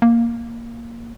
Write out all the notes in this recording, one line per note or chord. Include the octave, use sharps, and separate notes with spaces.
A#3